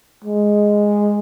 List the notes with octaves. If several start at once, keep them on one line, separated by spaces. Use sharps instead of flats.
G#3